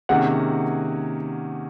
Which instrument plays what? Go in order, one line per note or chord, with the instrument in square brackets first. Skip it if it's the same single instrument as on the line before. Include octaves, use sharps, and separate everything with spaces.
[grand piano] C3 D#3 A#3 C#4 G#4 [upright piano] F#5